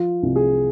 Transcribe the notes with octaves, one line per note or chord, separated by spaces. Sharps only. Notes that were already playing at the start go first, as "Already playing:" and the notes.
Already playing: F3 F4
C2
G#4